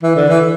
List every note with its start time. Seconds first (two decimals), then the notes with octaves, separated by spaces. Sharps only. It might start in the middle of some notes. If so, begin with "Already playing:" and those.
0.03 E3
0.17 D3
0.29 E3